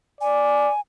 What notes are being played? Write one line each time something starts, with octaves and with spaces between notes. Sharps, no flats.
D5 G#5